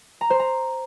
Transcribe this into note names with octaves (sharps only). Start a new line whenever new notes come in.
A#5
C5
A#5